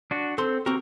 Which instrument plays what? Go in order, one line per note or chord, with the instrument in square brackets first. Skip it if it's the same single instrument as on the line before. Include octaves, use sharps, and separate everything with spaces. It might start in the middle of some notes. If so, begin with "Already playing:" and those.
[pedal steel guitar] D4 F#4
[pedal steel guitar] C4 [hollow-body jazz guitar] A4 C6
[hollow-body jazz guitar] C4 F#4 G4 [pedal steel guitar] A#4